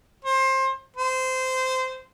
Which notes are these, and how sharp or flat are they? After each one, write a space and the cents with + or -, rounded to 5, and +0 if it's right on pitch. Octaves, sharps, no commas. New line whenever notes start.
C5 +25
C5 -15